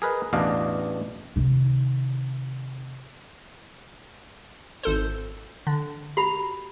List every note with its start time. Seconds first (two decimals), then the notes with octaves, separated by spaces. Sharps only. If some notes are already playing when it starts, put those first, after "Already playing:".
0.02 G#4 A#4 B4 D#5
0.33 A1 E2 B2 D4 D#5 F5
1.36 C3 D#3
4.83 G#1 A4 C5
5.67 D3
6.17 F#4 G4 A#5 B5